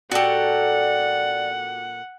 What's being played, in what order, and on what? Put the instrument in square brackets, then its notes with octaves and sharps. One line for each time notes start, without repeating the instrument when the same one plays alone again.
[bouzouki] A#2 A4 [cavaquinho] F#4 G4 [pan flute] D5 [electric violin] F#5